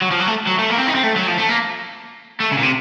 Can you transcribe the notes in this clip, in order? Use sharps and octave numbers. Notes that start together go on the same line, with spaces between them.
F#3
F3
F#3
A3
F#3
A3
A#3
C4
D#4
C4
A3
F#3
F3
A3
A#3
A3
C#3
A#2
C3